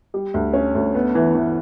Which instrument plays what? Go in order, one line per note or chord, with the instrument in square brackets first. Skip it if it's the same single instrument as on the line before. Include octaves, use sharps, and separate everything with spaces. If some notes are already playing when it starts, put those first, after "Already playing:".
[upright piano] G3
D2
C#4
D2
B3
E3
E3